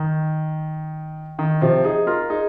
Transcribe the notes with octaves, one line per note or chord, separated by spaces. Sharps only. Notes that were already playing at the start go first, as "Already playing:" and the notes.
Already playing: D#3
D#3
C3 F3
D#4 G#4
F4 A#4
D#4 G#4